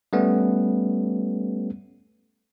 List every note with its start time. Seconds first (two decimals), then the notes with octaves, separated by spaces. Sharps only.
0.13 G3 A3 B3 C#4